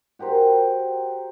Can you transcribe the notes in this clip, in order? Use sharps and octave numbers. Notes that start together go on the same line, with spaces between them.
F#4 G4 A#4 C5